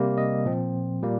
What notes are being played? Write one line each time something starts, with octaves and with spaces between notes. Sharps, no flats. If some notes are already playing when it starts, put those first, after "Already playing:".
Already playing: C3 G3 A#3
D#5
A#2 F3 C4
A#2 G3 A#3